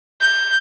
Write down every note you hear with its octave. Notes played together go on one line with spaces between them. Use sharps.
G6